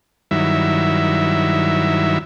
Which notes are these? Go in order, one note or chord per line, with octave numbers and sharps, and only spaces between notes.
G2 D#3 F#3 E4 E5